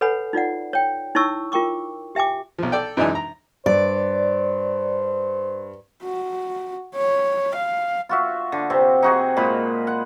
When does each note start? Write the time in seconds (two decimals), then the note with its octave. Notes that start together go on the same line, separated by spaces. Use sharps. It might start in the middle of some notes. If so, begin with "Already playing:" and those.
0.01 A4 B4 C#5 F#5 G#5 B5
0.33 D#4 F4 D5 F#5
0.73 C#5 G5
1.15 D#4 E4 C#5 A5 C#6 E6
1.52 F4 A#4 G5 C#6 D6
2.15 G4 E5 G5 G#5 D6
2.58 B1 F3
2.72 A4 D5 G5
2.97 F#2 E3 G#3 D4 D#4 G#5
3.15 A#5
3.66 G2 C5 D5
6.03 F#4
6.95 C#5
7.55 F5
8.09 F4 F#4 E5
8.52 D3
8.70 C3 C4
9.03 D#4 F#4 G#4
9.36 A#2 G#3 B5
9.87 F#5